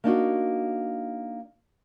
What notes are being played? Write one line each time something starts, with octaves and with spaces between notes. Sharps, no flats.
A#3 D4 D#4 F#4